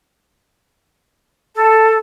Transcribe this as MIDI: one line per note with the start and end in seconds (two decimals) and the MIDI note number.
1.54 1.97 69